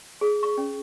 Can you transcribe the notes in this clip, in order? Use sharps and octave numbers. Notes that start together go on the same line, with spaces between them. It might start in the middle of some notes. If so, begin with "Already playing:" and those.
G#4
C#6
C#4